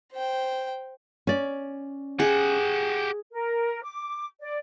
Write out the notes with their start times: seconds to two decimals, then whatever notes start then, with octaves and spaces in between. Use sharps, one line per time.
0.13 C5 G5
1.27 C#4 D5
2.20 G4 G#4 F#5
3.32 A#4
3.83 D6
4.41 D5